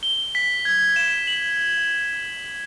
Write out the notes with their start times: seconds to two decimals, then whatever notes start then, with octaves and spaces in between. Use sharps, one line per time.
0.03 G7
0.35 B6
0.65 G#6
0.96 E7
1.27 F#7